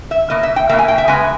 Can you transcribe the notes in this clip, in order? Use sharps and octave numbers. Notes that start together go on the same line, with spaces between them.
E5
B2 A#3 D#5
E5
G5
B2 A#3 E5
G#5
G5
E5
C#3 G#3 B3 G#5